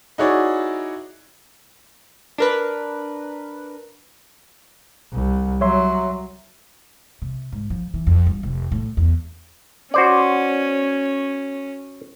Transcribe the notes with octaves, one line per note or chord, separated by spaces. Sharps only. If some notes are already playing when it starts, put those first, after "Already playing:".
D#4 E4 F#4 G#4 C#5 D5
D4 A#4 B4
C2
F#3 C#5 E5 C6
C3
G#2
F3
E3
F2
G2
F1
A2
E2
C#4 F#4 C5 D5